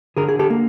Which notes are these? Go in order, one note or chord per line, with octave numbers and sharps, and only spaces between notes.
D3 G#4 A#4
G#4
G4 A4
A#3